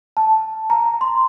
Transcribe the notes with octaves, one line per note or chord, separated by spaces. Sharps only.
A5
A#5
C6